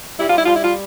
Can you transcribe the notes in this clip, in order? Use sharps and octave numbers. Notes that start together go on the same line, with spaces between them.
G3 E4
F4
E4
G3 F4
E4
F4